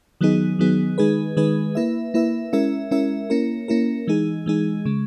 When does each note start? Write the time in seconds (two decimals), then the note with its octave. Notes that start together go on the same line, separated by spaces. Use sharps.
0.21 D#3 F#3 B3 D#4 G#4
0.59 D#3 F#3 B3 D#4 G#4
0.98 D#3 G#3 D#4 G#4 B4
1.37 D#3 G#3 D#4 G#4 B4
1.75 A#3 E4 B4 E5
2.14 A#3 E4 B4 E5
2.53 G#3 C#4 E4 A#4 E5
2.91 G#3 C#4 E4 A#4 E5
3.30 A#3 C#4 E4 A#4
3.68 A#3 C#4 E4 A#4
4.07 E3 G#3 D#4 G#4
4.46 E3 G#3 D#4 G#4
4.85 C#3 G#3